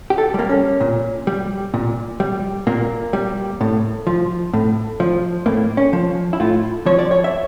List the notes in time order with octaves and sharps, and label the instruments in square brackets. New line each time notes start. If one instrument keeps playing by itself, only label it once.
[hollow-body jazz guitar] G4
A4
G3 A#3
C#4
A#2
G3
A#2
G3
A#2 A#3
G3
A2
F3
A2
F3
A2 A#3
C#4
F3
E4
A2 F4
F3 C#5
D5
C#5
E5